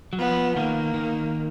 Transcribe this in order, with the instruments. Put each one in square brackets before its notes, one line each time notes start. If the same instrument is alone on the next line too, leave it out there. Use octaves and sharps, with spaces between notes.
[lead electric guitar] F#3
[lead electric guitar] F3 [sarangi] B3
[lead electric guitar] D#3 [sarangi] A#3
[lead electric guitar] D#3